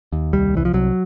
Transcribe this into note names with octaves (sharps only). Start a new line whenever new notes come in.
D#2
C2 G3
C2 E3
F3
C2 F#3